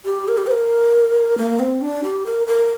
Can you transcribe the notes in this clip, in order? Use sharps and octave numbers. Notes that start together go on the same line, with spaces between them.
G4
A#4
G4
C5
A#4
A#3
C4
D4
G4
A#4
A#4